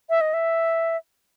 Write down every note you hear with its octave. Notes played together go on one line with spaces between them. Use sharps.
E5
D#5
E5